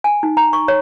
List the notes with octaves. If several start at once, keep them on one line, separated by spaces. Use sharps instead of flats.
G#5
D#4
A#5
C#6
C#5